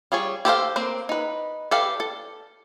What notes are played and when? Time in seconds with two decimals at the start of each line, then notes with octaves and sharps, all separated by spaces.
0.12 G3 F4 G#4 C#5
0.45 G4 A4 C5 F5
0.76 A#3 C4 C5
1.09 D#4 B4
1.71 G4 A4 B4 D5 F5
2.00 A4